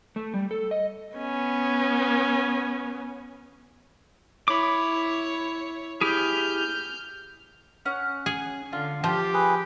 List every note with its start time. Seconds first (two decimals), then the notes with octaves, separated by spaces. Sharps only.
0.16 A3
0.34 G3
0.51 A4
0.71 D#5
1.16 B3 C#4
4.48 E4 C#5 B5 D6
6.01 E4 G4 G#4 F6 G6
7.85 C#4 F#5
8.26 G#4
8.73 D3 F4
9.04 F3 F4 G4 G5
9.34 G#4 B4